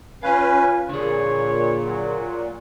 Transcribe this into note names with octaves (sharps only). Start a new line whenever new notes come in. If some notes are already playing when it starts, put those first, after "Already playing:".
C#4 F4 B4 F5 G#5
A#2 D3 G#4 C#5
F#3